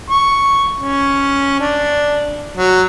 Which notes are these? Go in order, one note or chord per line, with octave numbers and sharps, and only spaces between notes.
C#6
C#4
D4
F#3